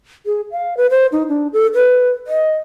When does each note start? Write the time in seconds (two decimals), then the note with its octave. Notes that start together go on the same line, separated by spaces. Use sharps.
0.26 G#4
0.51 F5
0.77 B4
0.90 C5
1.12 D#4
1.28 D4
1.53 A4
1.75 B4
2.27 D#5